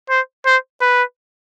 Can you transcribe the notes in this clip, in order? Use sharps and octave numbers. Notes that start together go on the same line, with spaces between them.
C5
C5
B4